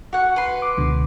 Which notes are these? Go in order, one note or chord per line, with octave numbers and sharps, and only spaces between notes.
F#4 F#5
B4 C6
D6
C#2 B2 D3